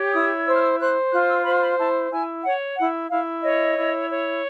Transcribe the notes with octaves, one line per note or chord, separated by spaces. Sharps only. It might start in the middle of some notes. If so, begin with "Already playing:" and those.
Already playing: G4 C#5
E4 D#6
C5 E6
F6
E6
C5 F#6
F4 F#6
E6
C5 B5
B5
E4 A5
E4 G#5
C#5 F#5
E4 F#5
E4 F5
C#5 D#5
E4
C#5